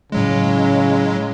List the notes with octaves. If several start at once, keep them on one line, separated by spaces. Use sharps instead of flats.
A2 C#3 F#3 G#3